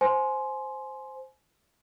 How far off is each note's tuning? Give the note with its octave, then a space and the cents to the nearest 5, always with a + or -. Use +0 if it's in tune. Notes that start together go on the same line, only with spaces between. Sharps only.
C5 +0 G#5 +25 C6 +0